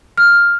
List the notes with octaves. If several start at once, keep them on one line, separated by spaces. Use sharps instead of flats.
F6